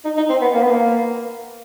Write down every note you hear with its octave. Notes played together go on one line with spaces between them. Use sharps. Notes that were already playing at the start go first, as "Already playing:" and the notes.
D#4
D#4
C4
B3
A#3
B3
A#3